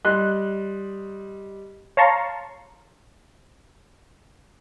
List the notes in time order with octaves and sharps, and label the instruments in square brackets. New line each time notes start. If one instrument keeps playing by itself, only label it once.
[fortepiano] G3 D#5 C6 F#6
[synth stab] C#5 F5 A5 A#5 C6 C#6